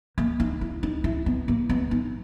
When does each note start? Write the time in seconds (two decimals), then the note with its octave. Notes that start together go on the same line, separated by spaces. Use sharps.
0.18 A#3
0.40 D#4
0.61 E4
0.83 D#4
1.04 E4
1.26 B3
1.48 A#3
1.70 B3
1.91 D#4